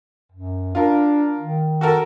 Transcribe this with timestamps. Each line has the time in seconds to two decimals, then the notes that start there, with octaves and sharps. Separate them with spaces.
0.32 F#2
0.75 D4 F4 A#4
1.38 D#3
1.81 F#4 A4 A#4